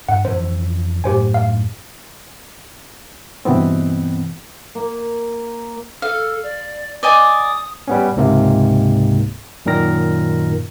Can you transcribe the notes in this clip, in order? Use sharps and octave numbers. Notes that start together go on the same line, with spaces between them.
G2 F#5
F2 E3 C#4 C5
F#2 A2 G4 C5 G#5
F5
G2 B2 E3 B3 C4
A#3
A4 F5
D5
D5 D#5 G#5 D#6
G3 B3 C#4
C#2 G#2 C3 A#3
F#2 A#2 D#3 A#4 A#6